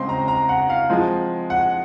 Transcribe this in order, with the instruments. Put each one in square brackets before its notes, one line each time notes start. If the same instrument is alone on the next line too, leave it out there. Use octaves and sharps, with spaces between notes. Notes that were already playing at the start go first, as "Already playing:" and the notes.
Already playing: [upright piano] C#3 G#3 C4 C6
A#5
A#5
F#5
F5
F3 G#3 C4
F#5